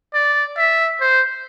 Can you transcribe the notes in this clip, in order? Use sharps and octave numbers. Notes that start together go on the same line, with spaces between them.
D5
E5
C5